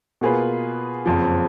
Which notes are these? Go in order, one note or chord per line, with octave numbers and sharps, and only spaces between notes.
B2 A#3 F4 G#4 B4
F#1 F2 F3